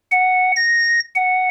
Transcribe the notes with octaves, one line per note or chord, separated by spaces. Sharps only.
F#5
A#6
F#5